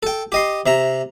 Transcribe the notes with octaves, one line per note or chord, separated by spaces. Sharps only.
A4 G5
G4 D#5 C6
C3 E5 A#5